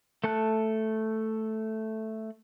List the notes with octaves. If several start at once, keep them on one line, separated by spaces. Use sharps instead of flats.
A3 A4 A5 F#6